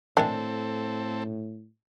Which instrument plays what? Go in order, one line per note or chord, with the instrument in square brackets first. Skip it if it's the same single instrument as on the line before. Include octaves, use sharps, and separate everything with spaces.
[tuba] A2 [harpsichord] D#3 G#3 E4 [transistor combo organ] C4 A4 [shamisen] D4